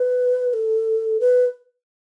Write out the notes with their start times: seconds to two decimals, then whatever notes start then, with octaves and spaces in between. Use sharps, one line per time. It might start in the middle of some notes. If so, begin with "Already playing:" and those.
Already playing: B4
0.50 B4
0.54 A4
1.20 B4